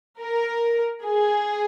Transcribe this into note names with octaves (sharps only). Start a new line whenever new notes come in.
A#4
G#4